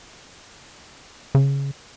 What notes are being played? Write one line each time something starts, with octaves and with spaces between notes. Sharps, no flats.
C#3